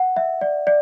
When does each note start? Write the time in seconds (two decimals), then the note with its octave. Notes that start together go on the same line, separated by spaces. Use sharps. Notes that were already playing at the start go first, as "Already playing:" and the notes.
Already playing: F#5
0.16 E5
0.41 D5
0.67 D5